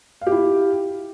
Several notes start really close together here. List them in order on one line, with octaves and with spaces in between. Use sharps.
F5 G4 E4